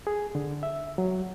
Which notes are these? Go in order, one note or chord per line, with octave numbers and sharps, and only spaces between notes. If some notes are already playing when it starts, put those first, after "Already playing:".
G#4
D3
E5
F#3